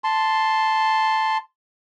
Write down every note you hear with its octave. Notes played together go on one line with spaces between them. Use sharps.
A5 C6